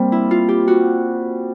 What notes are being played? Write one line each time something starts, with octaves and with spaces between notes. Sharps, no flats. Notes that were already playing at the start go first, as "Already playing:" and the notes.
Already playing: G3 A#3 C4
E4
F4
G4
F#4